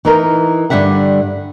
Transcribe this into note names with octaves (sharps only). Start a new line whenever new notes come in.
E3 D#4 A#4
G2 D3 F3 G3 E5 F#5